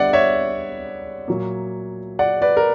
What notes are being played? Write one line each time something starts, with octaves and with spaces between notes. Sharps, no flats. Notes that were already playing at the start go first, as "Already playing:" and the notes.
Already playing: D3 G3 B3 D5 E5 F#5
C#5 E5
A#2 F#3 A#3
D5 F#5
B4 D5
A#4